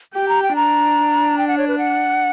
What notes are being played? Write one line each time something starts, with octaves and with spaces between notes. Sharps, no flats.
G4 G5
A#5
G5
D4 A#5
G5
F#5
C#5
B4
F#5